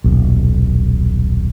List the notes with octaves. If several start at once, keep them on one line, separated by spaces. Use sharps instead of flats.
D#1 B1